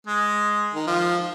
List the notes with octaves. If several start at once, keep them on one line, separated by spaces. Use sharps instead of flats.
G#3
D#3
F3